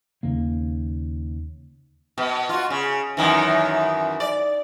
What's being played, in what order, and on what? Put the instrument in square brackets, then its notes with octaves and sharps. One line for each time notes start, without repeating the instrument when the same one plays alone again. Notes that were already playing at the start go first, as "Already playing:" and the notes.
[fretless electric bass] D#2 C#3 A#3
[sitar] B2
F4 F#4
C#3
F#2 D#3 E3
D5